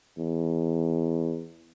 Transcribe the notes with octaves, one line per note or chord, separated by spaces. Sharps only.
E2